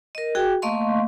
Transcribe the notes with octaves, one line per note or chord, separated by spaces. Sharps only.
A#4 D#5
F#4 G#4 G5
A3 A#3 D#5 F5 C6 C#6